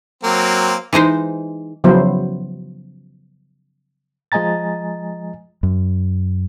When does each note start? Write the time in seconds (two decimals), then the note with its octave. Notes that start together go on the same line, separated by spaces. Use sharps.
0.23 F#3 A#3 C4
0.93 E3 G#3 D#4 C5
1.84 C#3 F3 F#3 B3 E4 C5
4.32 F3 G#3 D#5 G#5 A#5 A6
5.63 F#2